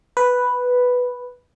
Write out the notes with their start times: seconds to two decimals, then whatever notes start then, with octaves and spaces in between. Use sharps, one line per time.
0.17 B4